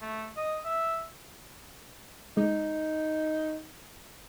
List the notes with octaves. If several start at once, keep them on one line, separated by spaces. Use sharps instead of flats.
A3
D#5
E5
G#3 D#4